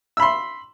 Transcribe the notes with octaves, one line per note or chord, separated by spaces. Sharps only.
B5 C6 E6